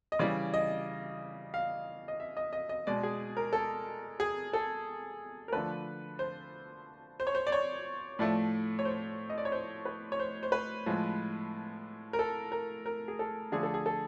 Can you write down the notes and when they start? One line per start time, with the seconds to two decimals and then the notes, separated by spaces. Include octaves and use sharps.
0.12 D#5
0.19 C#3 E3 G3 D5
0.54 D#5
1.54 F5
2.08 D#5
2.20 E5
2.37 D#5
2.53 D#5
2.69 D#5
2.87 B2 G#3 D5
3.03 G#4
3.37 A#4
3.53 A4
4.20 G#4
4.53 A4
5.48 A#4
5.52 D3 F3 A3 B4
6.19 C5
7.20 C5
7.27 C#5
7.35 C5
7.47 D5
7.52 C#5
8.19 A2 F3 A3 D5
8.79 C#5
8.85 C5
9.30 D#5
9.38 D5
9.45 C#5
9.52 C5
9.85 B4
10.12 C#5
10.19 C5
10.43 C5
10.52 B4
10.86 A2 F3 G#3
12.13 A#4
12.19 A4
12.52 A#4
12.86 A#4
13.08 G#4
13.19 A4
13.52 D3 F3 A3 G#4
13.63 A4
13.74 G#4
13.86 A4